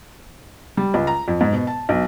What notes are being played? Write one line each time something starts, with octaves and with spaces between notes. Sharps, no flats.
G3
C#2
A#5
F2
G#2
B2
A5
B1